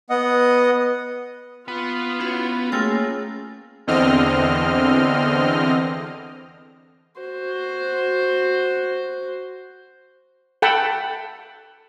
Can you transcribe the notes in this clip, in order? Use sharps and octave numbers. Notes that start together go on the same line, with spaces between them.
B3 D#5 F#5 D#6
B3 F4
C#4 E4 F#4
A3 A#3 C#4 F4 G#4 G5
E2 D3 C4 D#5 F6
F#4 C5
A4 F#5 G5 A5 B5